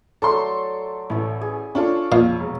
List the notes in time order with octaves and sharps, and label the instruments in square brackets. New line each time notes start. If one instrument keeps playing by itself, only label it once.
[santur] F#3 A3 D5 [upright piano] A4 C6
[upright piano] A1 [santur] A3 E4
[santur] G#4
[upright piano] D4 F4 A4 [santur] C#5 F5
[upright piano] F2 [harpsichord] A#2 F5 [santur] A5
[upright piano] E1